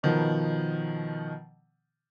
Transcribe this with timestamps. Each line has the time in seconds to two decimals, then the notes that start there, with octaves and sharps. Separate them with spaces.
0.03 B2 D#3 F3 B3